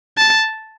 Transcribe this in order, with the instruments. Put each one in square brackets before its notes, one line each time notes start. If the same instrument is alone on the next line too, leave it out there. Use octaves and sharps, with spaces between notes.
[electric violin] A5